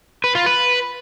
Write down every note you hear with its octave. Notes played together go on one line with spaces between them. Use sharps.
B4
F4
B4